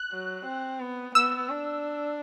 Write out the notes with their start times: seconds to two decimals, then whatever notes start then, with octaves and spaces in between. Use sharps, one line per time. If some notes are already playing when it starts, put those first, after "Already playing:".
Already playing: F#6
0.12 F#3
0.46 C4
0.80 B3
1.15 B3 E6
1.49 D4